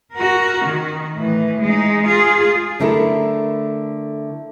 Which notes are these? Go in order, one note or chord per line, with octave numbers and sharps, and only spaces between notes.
F#4 A#4
D#3
A2 E3
G#3 D#4
F4 G#4
D3 A3 E4 A4 A#4